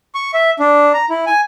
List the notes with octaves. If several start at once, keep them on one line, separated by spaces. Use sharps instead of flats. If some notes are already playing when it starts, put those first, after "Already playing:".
C#6
E5
D4
A#5
E4
G#5